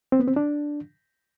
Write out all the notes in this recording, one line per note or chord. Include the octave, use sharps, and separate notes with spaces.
C4
B3
C4
D4